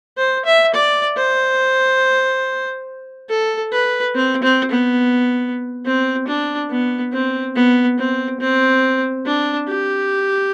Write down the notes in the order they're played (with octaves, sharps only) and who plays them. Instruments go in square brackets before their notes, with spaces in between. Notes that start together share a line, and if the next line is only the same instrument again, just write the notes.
[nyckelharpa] C5
E5
D5
C5
A4
B4
C4
C4
B3
C4
D4
B3
C4
B3
C4
C4
D4
G4